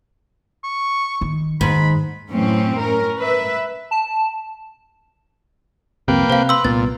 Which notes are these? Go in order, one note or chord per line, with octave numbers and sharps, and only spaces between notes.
C#6
D#3
G#2 D#3 B5
F#2 A2 E3 C4 C#4
C#4 A#4
B4 E5
A5
C2 F2 C3 A#3 B4 G5
C3 C5 F5
B4 C6 E6
C2 A#2 B3 A6